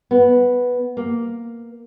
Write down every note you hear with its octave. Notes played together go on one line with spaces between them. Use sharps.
B3
A#3